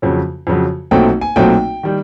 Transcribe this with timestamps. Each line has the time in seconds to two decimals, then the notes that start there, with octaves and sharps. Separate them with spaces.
0.02 F2 C#3 F#3
0.47 F2 C#3 F#3
0.91 B1 A#2 F#3 A3 C4 G5
1.21 G#5
1.36 B1 A#2 F#3 A3 C4 G5
1.83 D#3 G3